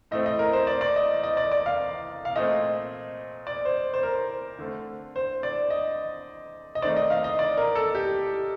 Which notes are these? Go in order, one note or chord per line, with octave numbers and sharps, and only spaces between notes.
A2 A3 C4 D#5
D#5
A#4
C5
D5
D5
D#5
D#5
D5
D5
F5
F5
A#2 A3 C4 D#5
D5
C5
C5
A#4
D3 A3 C4
C5
D5
D#5
D#5
D#3 A3 C4 D5
D#5
F5
D#5
D5
A#4
A4
G4